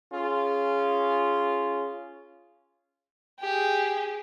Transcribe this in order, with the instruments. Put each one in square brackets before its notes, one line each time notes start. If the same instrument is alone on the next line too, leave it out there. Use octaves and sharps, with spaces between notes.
[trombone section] C#4 F4 G#4
[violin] G4 G#4